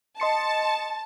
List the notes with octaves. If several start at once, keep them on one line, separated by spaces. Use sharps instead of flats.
D#5 A5 C6 C#7